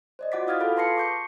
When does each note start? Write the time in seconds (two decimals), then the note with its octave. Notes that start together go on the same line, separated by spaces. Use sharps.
0.19 C5 D5 D#5
0.32 F4 F#4 F#5 D6 A6 B6
0.47 E4 F5 D#6 F6 G#6 A6
0.60 F4 G#4 A4 F5 B5 D#6
0.76 B4 A5 C6 A#6 C7 C#7
0.97 C#6 D6 G6 C#7